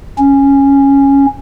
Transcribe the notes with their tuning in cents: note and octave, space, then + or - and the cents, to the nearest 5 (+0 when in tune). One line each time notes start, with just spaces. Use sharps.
C#4 -5